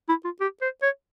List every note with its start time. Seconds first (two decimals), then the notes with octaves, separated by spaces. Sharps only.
0.09 E4
0.25 F4
0.40 G4
0.62 C5
0.82 C#5